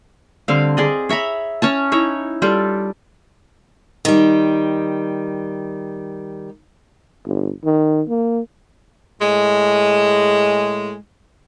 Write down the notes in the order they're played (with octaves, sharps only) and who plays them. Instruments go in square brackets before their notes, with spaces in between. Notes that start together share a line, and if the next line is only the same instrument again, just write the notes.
[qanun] D3 G3 C4 F5
G#4 D5 D#5
C#5 E5 A#5 B5
C#4 C#5 A5
D#4 E4 C#5
G3 F4 G4 A4
[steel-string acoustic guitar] D#3 G3
[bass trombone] G1
D#3
A#3
[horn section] A2 G#3